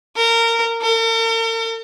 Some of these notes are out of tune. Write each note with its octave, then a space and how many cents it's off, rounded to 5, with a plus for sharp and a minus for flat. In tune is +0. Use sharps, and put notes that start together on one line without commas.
A#4 -20
A#4 -45